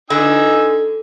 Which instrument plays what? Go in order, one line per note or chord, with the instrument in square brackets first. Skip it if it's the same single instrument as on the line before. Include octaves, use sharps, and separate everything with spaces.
[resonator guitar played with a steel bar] D3 [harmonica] D#4 G#5 E6